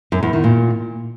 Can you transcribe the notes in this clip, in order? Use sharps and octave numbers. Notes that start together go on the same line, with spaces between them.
F#2
E2
D#3
A#2